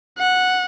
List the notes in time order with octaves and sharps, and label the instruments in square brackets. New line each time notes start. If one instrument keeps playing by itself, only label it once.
[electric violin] F#5